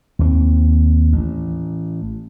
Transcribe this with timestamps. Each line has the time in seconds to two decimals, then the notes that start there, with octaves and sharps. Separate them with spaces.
0.19 D#2 G#3 C4
1.12 A1